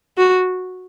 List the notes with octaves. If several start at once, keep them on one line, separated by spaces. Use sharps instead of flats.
F#4